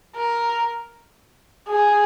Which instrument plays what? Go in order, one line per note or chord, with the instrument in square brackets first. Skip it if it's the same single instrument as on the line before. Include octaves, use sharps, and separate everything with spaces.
[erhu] A#4
G#4